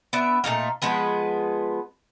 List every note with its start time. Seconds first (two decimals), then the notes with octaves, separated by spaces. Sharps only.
0.13 B3 D4 E5
0.44 A#2 A3 D#4 F5
0.82 F3 G#3 B3 B4